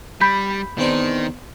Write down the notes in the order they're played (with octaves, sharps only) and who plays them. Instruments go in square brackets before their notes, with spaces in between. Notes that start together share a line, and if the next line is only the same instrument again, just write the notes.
[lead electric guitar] G3 [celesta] B5 G6 B6
[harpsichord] E2 C4 D4 [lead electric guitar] D#3